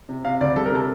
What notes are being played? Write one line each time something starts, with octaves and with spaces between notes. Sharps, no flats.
C3
C3 F5
D2 D5
G3 A4
A#4
C3 A4